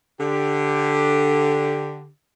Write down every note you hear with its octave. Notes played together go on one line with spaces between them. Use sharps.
D3 G4